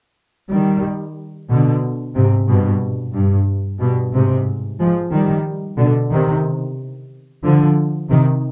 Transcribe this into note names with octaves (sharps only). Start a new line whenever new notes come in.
D#3 G3
B2 D3
G#2 C3
G2 B2
G2
G2 B2
G#2 C3
F3 G#3
D#3 G3
B2 D3
C3 D#3
D3 F3
C3 D#3